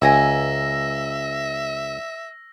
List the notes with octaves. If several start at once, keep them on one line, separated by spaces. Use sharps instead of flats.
C#2 A#4 E5 G#5 A#5 E6 A#6